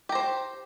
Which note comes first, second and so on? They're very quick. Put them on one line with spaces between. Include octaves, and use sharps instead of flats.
G4 A#5 C5